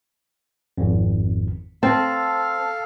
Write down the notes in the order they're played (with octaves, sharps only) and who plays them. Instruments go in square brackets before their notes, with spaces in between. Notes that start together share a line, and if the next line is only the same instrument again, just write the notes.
[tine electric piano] G#1 F2
[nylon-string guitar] C4 [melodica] A4 F5 [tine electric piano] A5